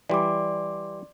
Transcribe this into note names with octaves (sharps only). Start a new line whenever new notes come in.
E3 G3 D5 C6 D6